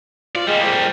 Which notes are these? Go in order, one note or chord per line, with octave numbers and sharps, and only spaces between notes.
F4 D5
G3 G#3 A#3
F2